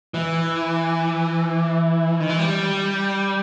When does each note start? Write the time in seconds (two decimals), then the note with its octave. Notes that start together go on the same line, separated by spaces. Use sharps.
0.14 E3
2.20 D#3
2.29 E3
2.39 G3